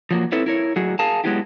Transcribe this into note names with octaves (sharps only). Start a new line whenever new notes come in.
F3 F#3 A#3
C4 E4 A4 B4 C#5
E4 A#4 C#5
A2 F#3 F#4 G#4
G#4 A#4 F5 G#5 A5
F#3 G#3 B3 E4 F4 G4